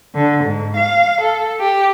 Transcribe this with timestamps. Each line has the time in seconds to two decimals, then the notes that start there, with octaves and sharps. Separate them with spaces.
0.15 D3
0.44 G#2
0.76 F5
1.22 A4
1.60 G4